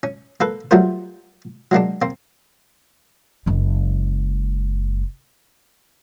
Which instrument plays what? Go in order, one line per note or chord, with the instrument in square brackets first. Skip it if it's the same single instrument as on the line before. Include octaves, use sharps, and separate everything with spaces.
[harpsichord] C#4
A#3 A4 B4
F#3 G3 A3 F4 A#4 C5
F#3 G#3 A#3 D4
A#3 C4
[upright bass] F#1 G#3